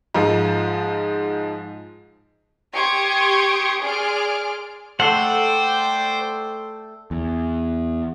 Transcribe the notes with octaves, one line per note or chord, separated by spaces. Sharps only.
G#2 F3 G#3
G4 C6 C#6 D#6 G#6 D7
G#4 D5 C6 F6 D7
A3 A4 C5 D5 F#5 G5 C6 E6
E2